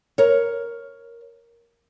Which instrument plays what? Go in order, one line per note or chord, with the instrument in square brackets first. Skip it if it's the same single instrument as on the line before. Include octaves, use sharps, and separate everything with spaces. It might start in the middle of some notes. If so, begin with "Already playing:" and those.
[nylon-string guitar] A#4 C#5